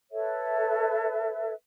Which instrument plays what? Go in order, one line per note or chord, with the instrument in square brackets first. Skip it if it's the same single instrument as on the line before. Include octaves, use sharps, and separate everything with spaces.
[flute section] A4 B4 C#5 E5